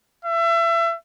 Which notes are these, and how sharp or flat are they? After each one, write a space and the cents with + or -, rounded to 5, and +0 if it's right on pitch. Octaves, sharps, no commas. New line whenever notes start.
E5 +30